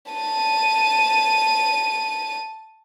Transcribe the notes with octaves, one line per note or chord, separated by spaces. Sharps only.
A5 D#7